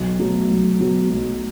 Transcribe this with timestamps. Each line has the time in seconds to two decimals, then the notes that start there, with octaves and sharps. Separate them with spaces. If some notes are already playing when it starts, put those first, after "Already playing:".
Already playing: B1
0.19 B2 F#3 A3
0.50 B1
0.80 B2 F#3 A3
1.10 B1